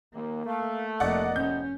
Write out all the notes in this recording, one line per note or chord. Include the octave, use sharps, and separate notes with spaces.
D#2 A#3
A3 F5
F1 A#3 D5 D#5 F#5
A2 C3 B3 C#4 G6